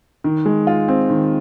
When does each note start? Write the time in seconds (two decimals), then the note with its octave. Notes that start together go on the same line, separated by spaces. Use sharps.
0.24 D#3
0.46 G#3
0.67 F4
0.88 C4
1.10 D#3